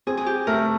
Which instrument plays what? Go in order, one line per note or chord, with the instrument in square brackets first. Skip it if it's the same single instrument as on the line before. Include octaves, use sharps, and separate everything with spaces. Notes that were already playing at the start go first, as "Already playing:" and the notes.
[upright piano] C4 [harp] G#4
[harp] G#4
G4
[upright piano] A3 [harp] A#4